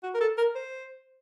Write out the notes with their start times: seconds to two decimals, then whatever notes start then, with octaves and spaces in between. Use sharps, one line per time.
0.03 F#4
0.14 A#4
0.20 A4
0.37 A#4
0.55 C5